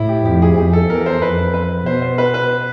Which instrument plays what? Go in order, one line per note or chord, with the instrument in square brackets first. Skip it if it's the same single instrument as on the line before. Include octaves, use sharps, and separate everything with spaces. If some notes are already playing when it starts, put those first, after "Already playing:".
Already playing: [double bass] A2 [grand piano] E4
[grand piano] G4
[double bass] F2 [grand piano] G4
[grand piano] G#4
[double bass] F2 [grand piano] G#4
[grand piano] A4
[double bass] E2 [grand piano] A#4
[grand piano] C5
[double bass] F2 [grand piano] B4
[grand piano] B4
[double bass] B2 [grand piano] C5
[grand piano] C5
B4
B4